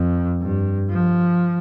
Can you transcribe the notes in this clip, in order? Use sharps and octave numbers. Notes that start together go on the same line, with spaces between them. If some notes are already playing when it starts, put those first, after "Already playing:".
Already playing: F2
G2
F3